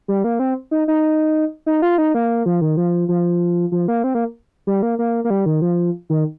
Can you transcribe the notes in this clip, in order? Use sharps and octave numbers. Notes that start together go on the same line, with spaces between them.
G3
A#3
C4
D#4
D#4
D#4
F4
D#4
A#3
F3
D#3
F3
F3
F3
A#3
C4
A#3
G3
A#3
A#3
A#3
G3
D#3
F3
D#3